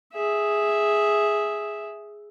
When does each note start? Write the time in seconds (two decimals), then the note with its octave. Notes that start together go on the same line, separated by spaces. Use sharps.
0.13 G#4 E5